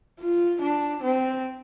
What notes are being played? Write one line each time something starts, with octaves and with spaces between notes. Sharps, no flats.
F4
D4
C4